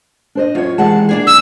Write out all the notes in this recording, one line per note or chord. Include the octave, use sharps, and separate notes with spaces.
D4 C5 D#5
F#2 F4 C#5
C3 D#3 E3 G#3 F#5 A5
A#3 D4 G#4
D#3 E6